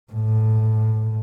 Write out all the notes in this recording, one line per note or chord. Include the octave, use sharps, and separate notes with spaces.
A2